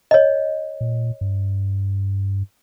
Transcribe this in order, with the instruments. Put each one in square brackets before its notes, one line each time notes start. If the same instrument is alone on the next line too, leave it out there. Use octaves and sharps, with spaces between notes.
[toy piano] C#5 D#5
[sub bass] A#2
G2